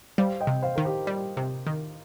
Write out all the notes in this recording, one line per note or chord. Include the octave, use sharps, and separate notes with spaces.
G3 C5 F5
D#5 G5
C3
C5 F5
D#3 A#4
G4 C5
G3
C3
D#3